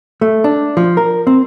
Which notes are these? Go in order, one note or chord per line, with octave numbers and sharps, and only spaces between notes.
A3
D4
F3
A#4
C4